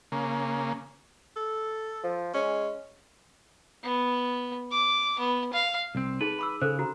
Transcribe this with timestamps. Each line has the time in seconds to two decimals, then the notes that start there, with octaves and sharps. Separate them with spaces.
0.12 C#3 A#3
1.36 A4
2.03 F3
2.34 G#3 C#4
3.83 B3
4.71 D6
5.20 B3
5.53 F5
5.95 C2 C4
6.21 D#4 G#4 B4 A5
6.39 B5 D6 E6
6.62 C#3 A4 C5
6.79 F#4 A#5